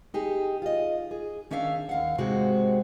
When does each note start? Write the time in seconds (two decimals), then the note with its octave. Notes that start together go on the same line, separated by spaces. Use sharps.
0.14 D#4 G4 G#4
0.62 F4 D#5
1.11 G#4
1.51 D#3 C#4 D4 E5 F5
1.89 D#2 F5 F#5
2.18 G#2 C3 G#3 C4 F#4